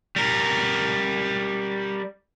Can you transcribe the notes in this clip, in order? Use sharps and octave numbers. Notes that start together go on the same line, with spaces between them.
G3 A#4